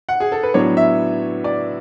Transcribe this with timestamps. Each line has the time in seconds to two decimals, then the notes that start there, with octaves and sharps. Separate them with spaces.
0.09 F#5
0.20 G#4
0.32 A4
0.43 B4
0.54 A2 F#3 B3 D4 C#5
0.77 E5
1.44 D5